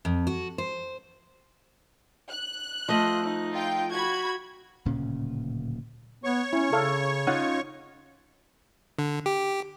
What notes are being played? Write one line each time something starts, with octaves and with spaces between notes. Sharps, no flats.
F2
F#4
C5
F#6
F3 A3 F4 D#5
D#4
F4 G5
F#4 B5 G#6
D1 A#2 C#3 C#4
B3 C#5 C#6
C#4 E4
C#3 A4 F5
C#4 D#4 F4 F#5
D3
G4